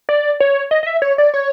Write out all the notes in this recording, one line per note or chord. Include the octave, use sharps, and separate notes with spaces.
D5
C#5
D#5
D#5
E5
C#5
D5
C#5